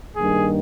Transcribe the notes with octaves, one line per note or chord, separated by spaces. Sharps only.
G2 D#3 A#3 G#4